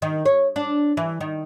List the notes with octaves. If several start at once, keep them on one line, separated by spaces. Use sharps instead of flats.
D#3
C#5
D4
E3
D#3